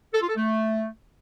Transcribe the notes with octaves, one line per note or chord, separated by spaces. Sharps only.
A4
F4
A4
A3